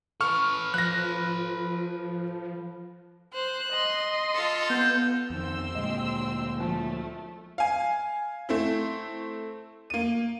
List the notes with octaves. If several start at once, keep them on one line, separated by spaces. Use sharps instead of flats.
A4 B4 C#6 F6
F3 F#6 A#6
C5 F#6
D#5 C6
F4 A4
B3 G6
F2 D#3 C4 C6 E6
D2 A#2 G#3 D#5
F3 A3
F5 G#5
A3 C4 E4
A#3 D#7